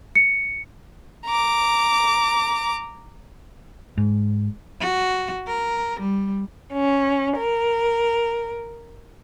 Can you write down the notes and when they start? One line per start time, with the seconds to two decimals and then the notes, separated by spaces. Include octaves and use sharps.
0.15 C#7
1.26 A#5 D6
3.97 G#2
4.80 F#4
5.47 A#4
6.00 G3
6.73 C#4
7.36 A#4